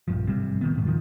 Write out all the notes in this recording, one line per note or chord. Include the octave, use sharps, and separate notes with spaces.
A#1 G2 F3
G#1 C3 G3
A2 D#3 B3
D#1 G#2
G#2 B2 D#3 F3